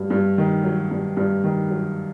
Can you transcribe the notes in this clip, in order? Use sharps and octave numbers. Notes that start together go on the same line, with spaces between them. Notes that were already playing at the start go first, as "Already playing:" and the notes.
Already playing: G2 F#3
G2
D#3
F#3
G2
G2
D#3
F#3